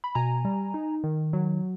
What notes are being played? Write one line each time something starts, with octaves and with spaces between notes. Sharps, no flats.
B5
B2 G#5 A#5
G3
D#4
D#3
F#3